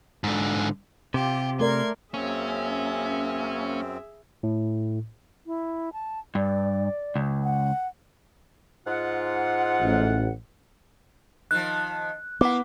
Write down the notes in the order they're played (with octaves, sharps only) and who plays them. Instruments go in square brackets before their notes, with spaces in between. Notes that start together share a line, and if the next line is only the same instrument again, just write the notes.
[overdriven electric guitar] G#2 D3
[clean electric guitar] C3 [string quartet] F4 G4
[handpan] A3 A#4 D5 [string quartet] C6 G#6
[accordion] F#2 C4 [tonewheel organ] A#3 [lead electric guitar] C#4 [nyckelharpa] G#4 E5
[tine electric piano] A2
[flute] E4
A5
[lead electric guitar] G2 [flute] D5
[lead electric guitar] C#2
[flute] F#5
[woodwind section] G#2 F4 F#5
[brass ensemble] A1
[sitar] D#3 F3 [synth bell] F#6
[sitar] A#3 E4 [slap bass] B3 [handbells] F#5 D6